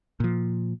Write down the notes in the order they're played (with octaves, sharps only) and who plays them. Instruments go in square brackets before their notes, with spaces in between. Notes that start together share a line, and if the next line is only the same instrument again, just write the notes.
[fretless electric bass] A#2 F3